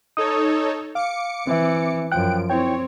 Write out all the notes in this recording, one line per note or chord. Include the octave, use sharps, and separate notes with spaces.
D#4 A4 C#5 D#6
F5 D6 C#7
E3 C4 E5
F#2 F3 G5 F#6 D7
C4 E4 C#5 G5